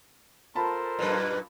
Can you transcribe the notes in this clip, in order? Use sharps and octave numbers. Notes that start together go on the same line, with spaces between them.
F4 A4 A#4 C5 A5 B5
F#2 A#2 B4